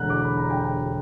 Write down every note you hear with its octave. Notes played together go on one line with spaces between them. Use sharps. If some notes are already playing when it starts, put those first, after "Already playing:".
Already playing: E1 E2 D3 F#5 A#5 F#6
D6
B5
A#5
G5
G5